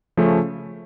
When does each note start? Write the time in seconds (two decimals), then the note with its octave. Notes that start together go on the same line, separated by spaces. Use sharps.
0.17 C#3 F3 A3 C#4